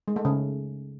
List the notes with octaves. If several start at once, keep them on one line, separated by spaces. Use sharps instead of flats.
G#3
A3
C#3